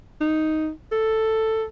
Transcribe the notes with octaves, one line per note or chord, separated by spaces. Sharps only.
D#4
A4